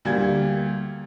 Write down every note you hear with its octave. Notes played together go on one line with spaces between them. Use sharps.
D2 G3 A#3 G#6